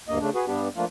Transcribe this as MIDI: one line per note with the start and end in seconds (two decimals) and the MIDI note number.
0.08 0.18 38
0.08 0.18 43
0.08 0.18 58
0.08 0.18 75
0.20 0.30 49
0.20 0.30 57
0.20 0.30 62
0.35 0.46 66
0.35 0.46 68
0.35 0.46 71
0.47 0.68 43
0.47 0.68 55
0.47 0.68 59
0.47 0.68 62
0.47 0.68 67
0.76 0.85 53
0.76 0.85 57
0.76 0.85 58
0.76 0.85 62
0.76 0.85 65